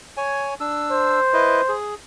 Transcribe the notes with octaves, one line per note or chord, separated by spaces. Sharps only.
C#5 G#5
D4 E6
C5
E4 B4 D#5
G#4